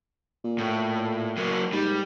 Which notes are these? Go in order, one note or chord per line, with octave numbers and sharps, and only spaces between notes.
A#2
A2
F#3 A#3
G#2 G3